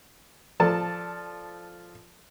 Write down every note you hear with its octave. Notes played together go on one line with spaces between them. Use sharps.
F3 A4 D5 A5